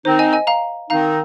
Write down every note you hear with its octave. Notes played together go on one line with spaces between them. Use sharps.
D#3 C4 D#4 C5
D#5 G#5
D#5 G#5
F5 A#5
D#3 C4 D#4 F5 A#5